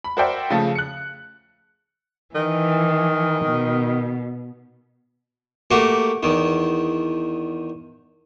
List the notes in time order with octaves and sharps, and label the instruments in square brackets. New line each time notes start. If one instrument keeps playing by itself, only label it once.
[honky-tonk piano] B5
F#4 A#4 C5 D5 E5 G5
C#3 F3 A3
F#6 C#7
[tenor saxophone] D#3 [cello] E3
[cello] B2
[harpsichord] A3 A#3 F#4 G4
E2 D#3